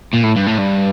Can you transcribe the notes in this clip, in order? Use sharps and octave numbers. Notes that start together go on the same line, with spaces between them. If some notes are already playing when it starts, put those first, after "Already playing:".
A#2
A2
G2
A2
G2